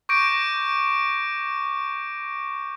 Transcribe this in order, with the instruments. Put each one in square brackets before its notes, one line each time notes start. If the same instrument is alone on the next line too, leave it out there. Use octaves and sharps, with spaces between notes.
[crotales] C#6 D6 G6 A#6 D7